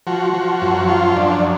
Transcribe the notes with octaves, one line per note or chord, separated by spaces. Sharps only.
F3 F#4
F3
F#2
F3 F4
F#2 D4